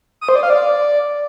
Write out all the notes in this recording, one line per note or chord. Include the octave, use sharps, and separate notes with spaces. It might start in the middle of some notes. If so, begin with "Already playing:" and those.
D#6
C5
D5
F5
D5